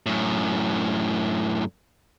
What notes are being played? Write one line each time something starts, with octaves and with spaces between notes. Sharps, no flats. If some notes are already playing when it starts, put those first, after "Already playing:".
F#2 A2